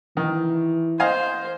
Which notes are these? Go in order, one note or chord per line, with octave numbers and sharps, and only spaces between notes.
D#3 E3
C5 D#5 F5 G#5